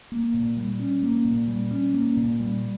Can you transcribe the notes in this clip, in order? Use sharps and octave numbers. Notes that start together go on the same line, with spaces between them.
A#3
A#2
G3
C#4
A#3
A#2
G3
C#4
A#3
A#2
G3